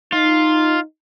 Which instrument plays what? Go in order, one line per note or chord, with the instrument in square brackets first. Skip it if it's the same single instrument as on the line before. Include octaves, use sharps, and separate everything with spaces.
[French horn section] D#4 [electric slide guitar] F4